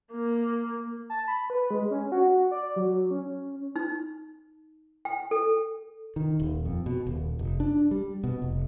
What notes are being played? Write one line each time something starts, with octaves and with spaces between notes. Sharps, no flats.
A#3
A5
B5
B4
G#3
C#4
F#4
D5
F#3
C#4
D#4
G5
A4
D#3
D#1
F2
B2
D#1
F1
D4
G3
B2
F1